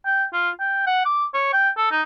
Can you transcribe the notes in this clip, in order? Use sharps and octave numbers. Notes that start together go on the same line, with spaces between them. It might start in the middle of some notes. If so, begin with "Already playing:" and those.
G5
F4
G5
F#5
D6
C#5
G5
A4
D#4